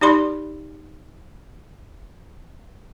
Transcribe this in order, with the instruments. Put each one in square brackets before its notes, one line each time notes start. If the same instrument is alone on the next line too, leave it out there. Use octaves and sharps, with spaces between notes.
[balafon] D#4 G4 D5 B5 C6